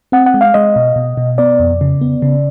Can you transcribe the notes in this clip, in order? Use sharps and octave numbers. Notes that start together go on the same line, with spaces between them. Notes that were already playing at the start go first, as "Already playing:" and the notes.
C4 F#5
F#5
G#3
F5
G#3 D#5
B2
B2
B2
B3 D5
F2
C#3
B3
C#3